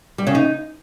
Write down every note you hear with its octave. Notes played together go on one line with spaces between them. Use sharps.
G3
C#3
D#4